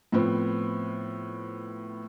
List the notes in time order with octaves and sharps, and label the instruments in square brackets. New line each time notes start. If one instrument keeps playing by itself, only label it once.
[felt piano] A2 F3 B3 C4